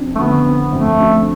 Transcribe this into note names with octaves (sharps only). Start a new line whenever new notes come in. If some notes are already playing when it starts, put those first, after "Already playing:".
Already playing: F2 D4
A3
D3 B3
C4
F2 A3
D4